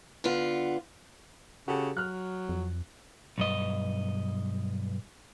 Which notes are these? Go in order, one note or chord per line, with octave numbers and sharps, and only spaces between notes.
D3 B3 F4
C#3 F#4 G4 A4
F#3 F6 F#6
F2
B1 G2 D#5